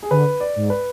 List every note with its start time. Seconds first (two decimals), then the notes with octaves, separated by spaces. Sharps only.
0.03 G#4
0.11 D3 B4
0.40 D5
0.56 G#2
0.70 B4